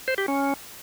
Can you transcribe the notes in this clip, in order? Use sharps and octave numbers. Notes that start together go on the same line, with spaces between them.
C5
G4
C#4